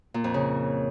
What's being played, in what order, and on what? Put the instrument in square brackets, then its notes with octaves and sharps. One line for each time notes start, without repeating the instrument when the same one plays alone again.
[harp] A#2
F2
C#3